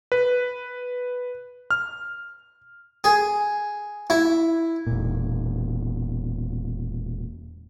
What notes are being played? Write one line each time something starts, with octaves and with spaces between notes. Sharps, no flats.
B4
F6
G#4
E4
E1 A#2